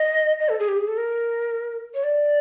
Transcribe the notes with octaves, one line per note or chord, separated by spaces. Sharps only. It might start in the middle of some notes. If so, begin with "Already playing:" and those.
Already playing: D#5
D#5
A4
G#4
G4
G#4
A4
A#4
C#5
D5